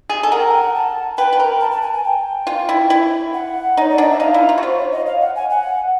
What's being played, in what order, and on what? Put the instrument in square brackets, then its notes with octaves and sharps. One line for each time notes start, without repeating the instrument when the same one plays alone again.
[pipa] G#4
A4
[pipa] A#4 [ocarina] F#5
[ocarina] G5
F#5
G5
F#5
A5
[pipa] B4 [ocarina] G5
[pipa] B4
A#4
[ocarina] A5
A5
G#5
G#5
G5
[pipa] F4
E4
E4
[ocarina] F#5
[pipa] D#4 [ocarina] C#5
[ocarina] D5
[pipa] D4 [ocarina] D#5
[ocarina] E5
[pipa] D#4 [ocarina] F5
[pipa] E4
F4
F#4
[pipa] F4 [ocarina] C5
[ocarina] C#5
D#5
F5
F#5
G#5
F#5